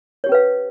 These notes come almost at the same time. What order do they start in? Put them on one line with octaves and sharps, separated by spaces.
C#5 G4 C#4 B4 F5